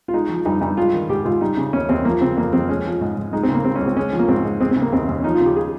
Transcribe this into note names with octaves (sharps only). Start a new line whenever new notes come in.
F4
G#3 D#4
F3
G2 D#4
G2 D#4
G#3 F4
D#3
G#2 G4
G#2 F4
G3 D#4
C#3
D#2 C#4
D#2 C4
F3 A#3
C#3 C4
F2 A#3
F2 C4
G#3 C#4
F3
G#2
G#2
G#3 D#4
C4
C#3
A#3
C#2 C4
C#4
C#2
C4
G#3 C#4
F3
A#3
G#2 C4
G#2
G#3 C4
C4
C#3
A#3
D#2 C4
D#2
C#4
F3 D#4
F4
C#3
G4
G#4